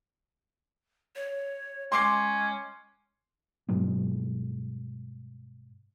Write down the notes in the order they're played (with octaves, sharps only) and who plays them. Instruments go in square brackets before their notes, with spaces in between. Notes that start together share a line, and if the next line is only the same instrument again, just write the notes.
[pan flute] C#5
[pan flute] G#3 [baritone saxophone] C#4 [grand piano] C6 D6 C7
[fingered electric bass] G2 B2 F#3 G#3